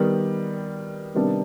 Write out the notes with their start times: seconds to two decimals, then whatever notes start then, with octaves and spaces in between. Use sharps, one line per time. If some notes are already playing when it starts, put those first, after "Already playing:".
Already playing: D#3 G3 B3
1.15 C3 D#3 G3 B3 D4